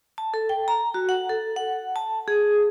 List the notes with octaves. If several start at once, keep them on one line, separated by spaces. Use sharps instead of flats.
A5
A4
G5
A#5
F#4
F#5
A4
F#5
A5
G#4